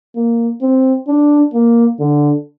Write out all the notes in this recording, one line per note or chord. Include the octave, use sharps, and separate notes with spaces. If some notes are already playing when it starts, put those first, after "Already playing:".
A#3
C4
D4
A#3
D3